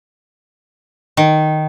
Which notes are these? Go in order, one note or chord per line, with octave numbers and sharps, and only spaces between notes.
D#3